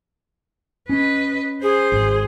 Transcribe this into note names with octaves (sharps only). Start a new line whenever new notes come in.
C#4 B4 D#5
G#4 C5
G#1